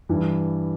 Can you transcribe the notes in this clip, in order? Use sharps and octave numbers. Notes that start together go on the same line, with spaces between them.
G2 E3